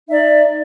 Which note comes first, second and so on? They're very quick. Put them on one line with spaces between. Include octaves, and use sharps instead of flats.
D#4 E5 D5